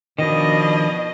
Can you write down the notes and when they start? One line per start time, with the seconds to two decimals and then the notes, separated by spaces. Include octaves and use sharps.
0.19 B2 D#3 F3 D4 D#5